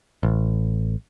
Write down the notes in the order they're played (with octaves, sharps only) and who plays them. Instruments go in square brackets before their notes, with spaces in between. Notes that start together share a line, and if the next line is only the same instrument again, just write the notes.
[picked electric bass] A1